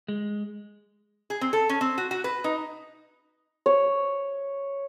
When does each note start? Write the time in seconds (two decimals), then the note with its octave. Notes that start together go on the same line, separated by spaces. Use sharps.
0.08 G#3
1.30 G#4
1.41 C4
1.53 A4
1.69 C#4
1.81 C4
1.98 F#4
2.11 F#4
2.24 B4
2.44 D#4
3.66 C#5